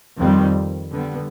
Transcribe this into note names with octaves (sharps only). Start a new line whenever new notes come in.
F2 D#3 G3 C4
D3 G3 B3